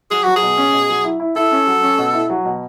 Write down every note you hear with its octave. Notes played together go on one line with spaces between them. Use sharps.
F#3 G#4
F#3 F#4
G#4
B2
C#4
B2
F#3
E4
E4
E4 A4
C#4
F#3
C#4
B2
E4
F#3
B2